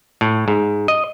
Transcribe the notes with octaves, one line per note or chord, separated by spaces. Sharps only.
A2
G#2
D#5